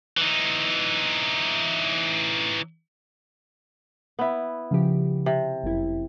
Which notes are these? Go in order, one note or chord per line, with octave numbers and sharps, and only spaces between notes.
E3 D#4
B3 E4
C#3 F3 G4
C3
G1 F#2 E4